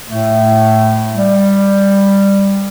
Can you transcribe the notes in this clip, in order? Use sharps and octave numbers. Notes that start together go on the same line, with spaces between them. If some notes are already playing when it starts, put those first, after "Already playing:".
A2 A3
G3